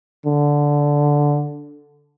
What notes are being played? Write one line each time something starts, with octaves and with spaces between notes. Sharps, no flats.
D3